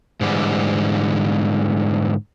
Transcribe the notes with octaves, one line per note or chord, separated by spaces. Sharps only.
G#2 D3 E3 G3